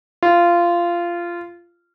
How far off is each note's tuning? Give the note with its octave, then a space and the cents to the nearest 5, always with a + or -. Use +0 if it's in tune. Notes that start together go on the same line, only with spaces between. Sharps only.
F4 -15